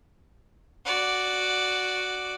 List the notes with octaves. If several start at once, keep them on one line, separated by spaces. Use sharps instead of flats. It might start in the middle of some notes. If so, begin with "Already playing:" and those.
F#4 D5